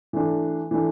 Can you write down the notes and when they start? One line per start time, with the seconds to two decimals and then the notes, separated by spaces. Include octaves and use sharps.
0.13 E3 A3 D4
0.71 E3 A3 D4